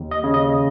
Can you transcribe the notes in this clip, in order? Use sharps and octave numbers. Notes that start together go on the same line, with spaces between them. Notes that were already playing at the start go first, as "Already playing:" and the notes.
Already playing: D#2
D#5
C#3
D#5